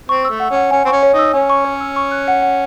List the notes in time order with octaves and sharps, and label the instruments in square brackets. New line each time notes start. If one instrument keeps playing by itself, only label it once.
[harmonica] C4 [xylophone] C#6
[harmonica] A3 [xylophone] E6
[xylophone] F#5
[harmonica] C#4 [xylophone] F#5
[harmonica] C#4 [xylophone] G#5
[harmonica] C4 [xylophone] C#6
[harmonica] C#4
[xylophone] C#5
[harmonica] D#4
[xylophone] E6
[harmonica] C#4 [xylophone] G#5
[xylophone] C#6
C#5
E6
C#6
F#6
F#5
F#5